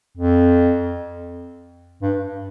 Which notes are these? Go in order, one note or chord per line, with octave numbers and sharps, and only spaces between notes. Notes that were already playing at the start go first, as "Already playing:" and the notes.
F2
G2